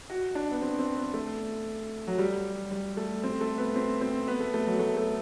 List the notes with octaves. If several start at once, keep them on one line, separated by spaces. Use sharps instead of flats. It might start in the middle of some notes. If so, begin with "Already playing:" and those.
F#4
D4
B3
C4
C4
B3
A3
F#3
G3
G3
A3
C4
A3
B3
C4
C4
B3
A3
A3
F#3
A3
A3